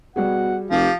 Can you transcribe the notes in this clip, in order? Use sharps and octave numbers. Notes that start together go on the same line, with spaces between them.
B2 G3 F#4 G#4 F#5
F1 F3 G4